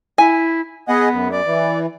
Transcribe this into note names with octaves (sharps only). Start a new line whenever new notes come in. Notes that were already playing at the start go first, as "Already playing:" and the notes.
E4 G#5
B3 G#4 D#5 F#5
F#2
D5
E3